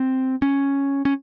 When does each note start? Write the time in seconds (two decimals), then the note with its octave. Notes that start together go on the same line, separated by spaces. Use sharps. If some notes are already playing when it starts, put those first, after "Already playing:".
Already playing: C4
0.42 C#4
1.05 C#4